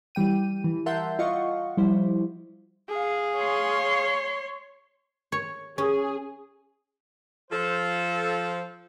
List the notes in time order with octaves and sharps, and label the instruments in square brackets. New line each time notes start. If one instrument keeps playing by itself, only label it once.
[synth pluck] E3 G3 G5 D#7
E3
A#4 E5 F#5 A5 C6 G6
F4 D#5 F5 F#5 C#6
F3 G3 E4 C5
[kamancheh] G#4 F5
[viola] C#5 C6
[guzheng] C#5
[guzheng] C#4 [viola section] G#4
[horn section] F3 A4 C5